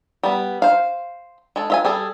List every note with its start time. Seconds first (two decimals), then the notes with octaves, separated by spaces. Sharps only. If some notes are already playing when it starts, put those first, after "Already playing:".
0.23 G3 B3
0.62 C5 F5
1.56 G#3 A4
1.70 F4 E5 G#5
1.85 G3 G#4 A4